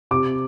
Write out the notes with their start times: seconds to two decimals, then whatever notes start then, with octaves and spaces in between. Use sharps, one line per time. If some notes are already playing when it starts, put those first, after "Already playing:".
0.11 C3 D6